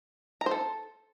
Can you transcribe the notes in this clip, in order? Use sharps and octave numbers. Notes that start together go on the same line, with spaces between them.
A#5
C5
A4